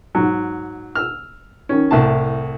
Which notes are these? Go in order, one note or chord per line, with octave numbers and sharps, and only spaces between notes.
G#2 F#3
E6 F6
D#3 C#4
C2 A2 A5